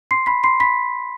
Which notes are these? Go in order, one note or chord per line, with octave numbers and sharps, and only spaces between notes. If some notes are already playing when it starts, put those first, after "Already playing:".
C6 C7
B5 B6
C6 C7
B5 B6